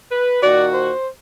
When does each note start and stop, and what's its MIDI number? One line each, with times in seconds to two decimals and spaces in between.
0.11 0.42 71
0.42 0.91 46
0.42 0.91 51
0.42 0.91 66
0.42 0.65 74
0.73 1.08 72